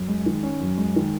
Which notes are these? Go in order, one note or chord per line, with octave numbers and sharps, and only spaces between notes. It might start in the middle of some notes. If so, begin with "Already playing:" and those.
Already playing: F#2
G#3
D#3
C#4
F#2
G#3
D#3